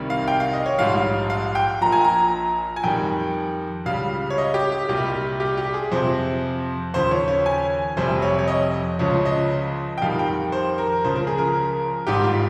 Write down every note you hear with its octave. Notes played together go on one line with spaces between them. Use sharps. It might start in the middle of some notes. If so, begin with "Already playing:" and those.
Already playing: C2 C3 D#3 G3
F5
G5
F5
D#5
C#5
A#1 G#2 G3 F5
F5
G5
A#1 A#2 F3 A#5
G#5
A#5
G#5
F2 D#3 G3 G5
C#2 C#3 G3 F5
C#5
D#5
G4
G4
C2 A#2 G3 G4
G4
G4
G#4
F2 C3 F3 C5
D#2 C#3 F3 C5
C#5
C#5
G#5
F1 F2 C3 G3 C5
C#5
C#5
D#5
C#2 C#3 F3 C#5
D#5
G5
F2 D#3 G3 F5
G5
C5
A#4
C#2 C#3 F3 C5
A#4
G#4
A#4
G#1 G#2 G3 G4
F4